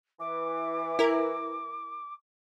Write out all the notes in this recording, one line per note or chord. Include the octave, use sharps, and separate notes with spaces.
E3 D6
E4 A#4